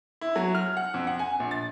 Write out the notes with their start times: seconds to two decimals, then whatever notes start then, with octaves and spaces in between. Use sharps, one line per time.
0.21 E4
0.36 F#3
0.55 F6
0.77 F#5
0.94 F2
1.07 F#5
1.19 G#5
1.40 A#1
1.51 A6